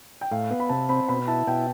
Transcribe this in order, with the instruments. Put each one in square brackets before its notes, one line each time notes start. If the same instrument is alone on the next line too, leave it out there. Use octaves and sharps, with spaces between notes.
[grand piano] G5
[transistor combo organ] A2 [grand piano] F5
[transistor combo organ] B3
[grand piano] B5
[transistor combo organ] C3 [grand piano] A5
[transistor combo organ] C4 [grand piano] B5
[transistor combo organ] B2 [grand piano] B5
[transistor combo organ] E4 [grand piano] A5
[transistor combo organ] B2 [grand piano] G5